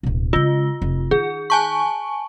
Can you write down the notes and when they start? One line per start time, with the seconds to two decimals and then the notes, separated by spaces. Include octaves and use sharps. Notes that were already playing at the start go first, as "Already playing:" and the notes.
0.03 D1 B2
0.33 C#3 G#3 F4
0.82 F1
1.11 D#3 G#4
1.50 G#5 A5 C#6